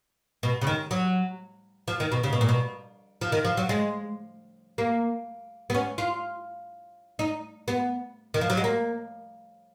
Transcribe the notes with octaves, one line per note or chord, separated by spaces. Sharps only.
B2
C#3
D#3
F#3
F3
D#3
B2
C#3
B2
A#2
B2
F3
D#3
F3
F#3
G#3
A#3
B3
C#4
F4
D#4
B3
D#3
F3
F#3
G#3
A#3